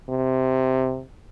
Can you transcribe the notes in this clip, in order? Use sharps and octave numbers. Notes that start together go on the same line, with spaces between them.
C3